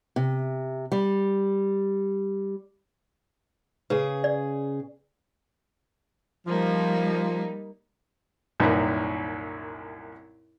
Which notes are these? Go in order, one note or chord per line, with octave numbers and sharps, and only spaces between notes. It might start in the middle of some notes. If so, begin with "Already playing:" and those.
C3
G3
C#3 G#4 B4
D5
F3 G3 A#3 D#4
C2 F#2 A#2 D#3 B4